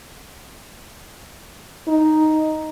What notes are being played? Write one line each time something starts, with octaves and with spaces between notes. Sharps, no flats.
D#4